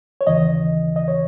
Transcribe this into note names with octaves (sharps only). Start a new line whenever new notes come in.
C#5
D#2 C#3 E3 D#5
D#5
C#5